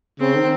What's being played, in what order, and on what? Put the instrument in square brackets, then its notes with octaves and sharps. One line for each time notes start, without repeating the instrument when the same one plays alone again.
[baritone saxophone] C#3 [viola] C4
[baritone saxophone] D#3